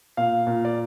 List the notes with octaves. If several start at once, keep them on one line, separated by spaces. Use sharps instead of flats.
A#2 F5
A#2
D5